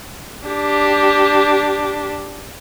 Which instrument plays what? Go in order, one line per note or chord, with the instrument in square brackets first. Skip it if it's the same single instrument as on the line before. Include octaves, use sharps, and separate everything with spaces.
[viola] D4 G4